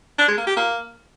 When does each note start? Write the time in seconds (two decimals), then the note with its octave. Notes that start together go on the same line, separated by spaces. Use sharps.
0.19 D4
0.28 G#3
0.38 A#3
0.47 G4
0.57 A#3